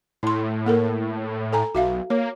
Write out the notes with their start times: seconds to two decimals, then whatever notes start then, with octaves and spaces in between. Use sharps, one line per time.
0.23 A2 E4 C6
0.66 A#3 A4 A#4
1.53 A4 G#5 A#5
1.75 B1 F#4 E5 F5
2.10 A#3 C#5